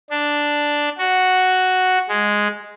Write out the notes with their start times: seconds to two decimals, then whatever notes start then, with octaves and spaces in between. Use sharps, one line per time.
0.10 D4
0.98 F#4
2.09 G#3